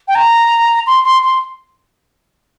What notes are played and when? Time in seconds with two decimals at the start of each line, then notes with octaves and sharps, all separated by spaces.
0.08 G5
0.15 A#5
0.87 C6
1.04 C6
1.22 C6